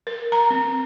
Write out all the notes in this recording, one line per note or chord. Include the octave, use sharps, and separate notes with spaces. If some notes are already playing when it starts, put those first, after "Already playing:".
A#4
A#5
C4